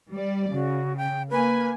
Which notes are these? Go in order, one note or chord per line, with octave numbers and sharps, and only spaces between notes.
G3 D5
C#3 F#4
G5
A#3 B4 G#5